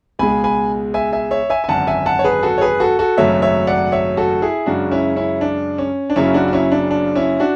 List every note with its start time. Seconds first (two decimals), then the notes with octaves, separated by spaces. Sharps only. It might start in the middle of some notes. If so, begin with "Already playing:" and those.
0.19 C#2 B2 G#3 G#5 B5
0.44 G#5 B5
0.94 E5 G#5
1.13 E5 G#5
1.31 C#5 E5
1.50 E5 G#5
1.64 G#5
1.68 G#1 F#2 D3 F#5 A5
1.87 E5 G#5
2.06 F#5 A5
2.19 C#5
2.24 G#4 B4
2.43 F#4 A4
2.58 C#5
2.61 G#4 B4
2.80 F#4 A4
2.99 F#4 A4
3.17 G#1 F#2 C#3 F#3 A3 C#5 E5
3.42 C#5 E5
3.67 D5 F#5
3.92 C#5 E5
4.17 F#4 A4
4.42 E4 G#4
4.66 F#2 C#3 G#3 D4 F#4
4.91 C#4 E4
5.16 C#4 E4
5.41 D4
5.78 C#4
6.10 D4
6.16 F#1 F#2 C#3 F#3 C#4 E4
6.34 D4 F#4
6.47 F#4
6.53 C#4 E4
6.72 D4
6.91 D4
7.15 C#4 E4
7.40 D4 F#4